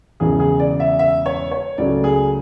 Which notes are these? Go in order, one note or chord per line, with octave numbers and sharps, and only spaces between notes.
E1 E2 C#3 E3 G#4
G#4
D5
E5
E5
C#5
C#5
C#2 C#3 F#3 A3 D5
G#4